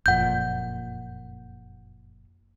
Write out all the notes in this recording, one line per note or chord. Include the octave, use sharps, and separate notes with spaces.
F#1 F2 A#2 F#5 G6